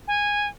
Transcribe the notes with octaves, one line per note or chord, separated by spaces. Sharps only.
G#5